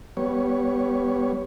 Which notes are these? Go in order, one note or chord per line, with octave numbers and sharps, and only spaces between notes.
G3 B3 C#5